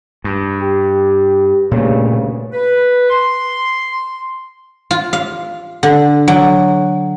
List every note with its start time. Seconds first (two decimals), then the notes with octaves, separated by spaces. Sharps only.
0.24 G2
0.61 G4
1.71 D2 G2 A#2 C#3 A3
2.53 B4
3.10 C6
4.91 F4
5.13 F5
5.83 D3
6.28 F#3